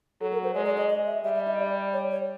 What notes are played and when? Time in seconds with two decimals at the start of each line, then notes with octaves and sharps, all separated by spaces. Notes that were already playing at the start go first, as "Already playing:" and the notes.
0.21 F#3 A4
0.32 A#4
0.44 C5
0.55 G#3 D5
0.66 D5
0.78 D#5
0.90 D#5
1.07 E5
1.24 G3 E5
1.36 E5
1.48 D#5
1.59 D5
1.93 C#5
2.11 C#5